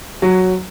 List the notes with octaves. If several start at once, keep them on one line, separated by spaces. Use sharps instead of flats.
F#3